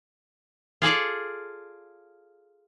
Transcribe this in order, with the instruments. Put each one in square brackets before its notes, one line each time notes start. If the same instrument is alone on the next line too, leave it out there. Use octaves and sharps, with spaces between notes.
[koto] F4 G#4 A4 D5